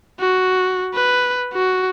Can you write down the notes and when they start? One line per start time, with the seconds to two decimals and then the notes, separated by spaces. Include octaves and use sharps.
0.20 F#4
0.95 B4
1.53 F#4